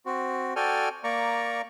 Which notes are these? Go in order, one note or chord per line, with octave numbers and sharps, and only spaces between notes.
C4 F#4
F#4 A4 D5 G5 G#5 F6
A#3 D5 A#5 C#6